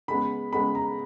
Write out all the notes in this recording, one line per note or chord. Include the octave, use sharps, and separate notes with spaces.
C#3 G#3 B3 B5
C#3 G#3 B3 B5
A#5